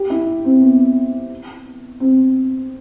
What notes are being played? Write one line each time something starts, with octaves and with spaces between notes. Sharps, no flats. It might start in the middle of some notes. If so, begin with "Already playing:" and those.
Already playing: G4
E4
C4
B3
C4